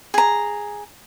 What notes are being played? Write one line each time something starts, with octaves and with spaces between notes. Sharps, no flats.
G#4 A#5